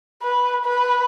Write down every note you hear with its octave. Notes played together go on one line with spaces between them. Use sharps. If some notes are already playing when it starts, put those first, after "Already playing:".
B4
B4